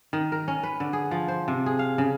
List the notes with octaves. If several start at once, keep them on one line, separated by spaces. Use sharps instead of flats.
D#3
A#4
C#4
B4
D3
G#4
F3
C5
C3
G#4
F5
C#3